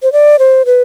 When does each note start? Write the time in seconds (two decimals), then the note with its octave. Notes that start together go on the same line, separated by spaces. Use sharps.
0.03 C5
0.12 D5
0.39 C5
0.66 B4